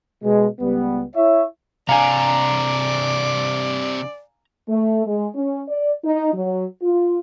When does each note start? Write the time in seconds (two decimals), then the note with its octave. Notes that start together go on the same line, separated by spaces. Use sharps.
0.23 B2 G#3
0.60 C#2 G3 B3
1.14 E4 C#5 E5
1.89 C3 D4 D5 F5 G#5 A#5
4.69 A3
5.05 G#3
5.35 C#4
5.68 D5
6.04 D#4
6.34 F#3
6.82 F4